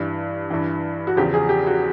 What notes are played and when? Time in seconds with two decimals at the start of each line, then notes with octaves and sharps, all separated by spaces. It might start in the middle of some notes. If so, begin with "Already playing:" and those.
Already playing: G2 E3
0.50 G2 E3
1.07 F#4
1.16 E2 C#3 F3 G4
1.34 G#4
1.49 G4
1.67 F#4